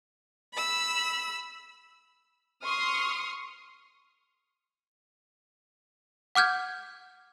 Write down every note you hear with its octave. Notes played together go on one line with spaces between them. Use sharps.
B5 E6
C6 C#6 D#6 F6
F#5 D6 F6 G6 G#6